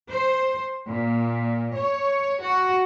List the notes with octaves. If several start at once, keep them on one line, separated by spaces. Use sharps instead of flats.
C5
A#2
C#5
F#4